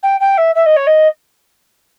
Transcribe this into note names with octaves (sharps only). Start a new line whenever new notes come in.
G5
G5
E5
E5
D#5
C#5
D#5